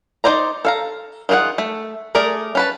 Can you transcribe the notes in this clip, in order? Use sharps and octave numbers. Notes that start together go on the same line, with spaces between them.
D#4 F#4 C5 D5 A#5
A4 F5 A#5
D#3 F4 F#4 G#4 F#5
A3
A3 G#4 A#4 D5
C#4 B4 A5